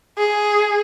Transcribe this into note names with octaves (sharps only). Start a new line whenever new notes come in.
G#4